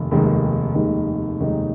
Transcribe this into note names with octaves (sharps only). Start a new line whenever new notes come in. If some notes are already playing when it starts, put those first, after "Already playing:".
Already playing: F1 D#2 D#3 D#4
F1 D#2 D#3 G#3 D#4
F1 D#2 D#3 G#3 D#4
F1 D#2 D#3 G#3 D#4